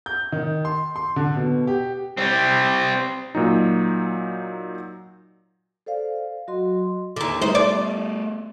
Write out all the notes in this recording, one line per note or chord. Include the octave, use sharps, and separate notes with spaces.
G6
D#3
C6
C6
D3
B2
G4
G3 C4
A#2 F#3 D#4
A4 C5 D5 F5
F#3 F#4 D#5 C6
D#2 D3
G3 A3 D#4 C5
D5